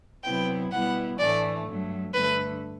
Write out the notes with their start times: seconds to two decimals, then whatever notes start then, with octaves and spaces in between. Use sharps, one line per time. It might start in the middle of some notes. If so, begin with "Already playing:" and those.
0.24 C3 F#3 B3 E4 G5
0.72 B2 G3 B3 E4 F#5
1.19 A2 E3 A3 D4 D5
1.66 G2 F#3 A3
2.14 G2 D3 A3 B4